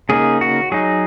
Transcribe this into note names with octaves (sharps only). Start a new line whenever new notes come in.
C#3 A#3 D#4 G#4
F#4
F#3 D#4 G#4